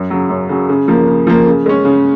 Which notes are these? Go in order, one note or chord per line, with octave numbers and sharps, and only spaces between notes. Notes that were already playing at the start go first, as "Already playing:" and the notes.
Already playing: F#2
C#3 F#3
F#2
C#3 F#3
C#3
F3 A#3
C#3
F3 A#3
C#3
G#3 C#4
C#3